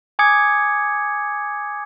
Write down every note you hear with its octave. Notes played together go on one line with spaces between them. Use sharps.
G#5 D6 D#6 G#6 C#7